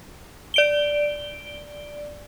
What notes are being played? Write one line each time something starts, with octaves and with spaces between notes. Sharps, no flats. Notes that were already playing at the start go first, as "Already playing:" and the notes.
D5 D7 G7